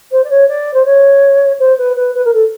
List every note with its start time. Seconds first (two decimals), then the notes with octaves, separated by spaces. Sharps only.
0.12 C5
0.24 D5
0.30 C#5
0.48 D5
0.74 C5
0.85 C#5
1.59 C5
1.78 B4
1.96 B4
2.15 B4
2.25 A#4
2.34 A4